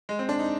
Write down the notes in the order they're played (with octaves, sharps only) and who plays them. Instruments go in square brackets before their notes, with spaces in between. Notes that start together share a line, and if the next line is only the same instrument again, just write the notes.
[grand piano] G#3
C4
D4
D#4